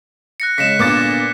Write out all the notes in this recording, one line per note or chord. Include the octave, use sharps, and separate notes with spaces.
F#6 A#6 C#7
C#3 G#3 B6 C#7 E7
A#2 D3 B3 D6 A6